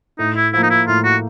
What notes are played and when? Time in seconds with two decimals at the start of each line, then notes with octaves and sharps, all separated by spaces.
0.19 A2 D#4
0.36 E4
0.53 F3 A#3 E4
0.63 D#4
0.70 E4
0.87 A2 F4
1.04 F#4